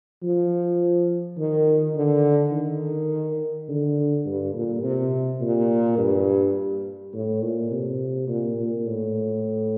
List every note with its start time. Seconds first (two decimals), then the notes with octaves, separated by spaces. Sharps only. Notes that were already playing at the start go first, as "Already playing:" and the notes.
0.23 F3
1.38 D#3
1.96 D3
2.52 D#3
3.69 D3
4.26 G2
4.55 A#2
4.83 C3
5.41 A#2
5.98 G2
7.14 A2
7.42 A#2
7.71 C3
8.28 A#2
8.58 A#2
8.86 A2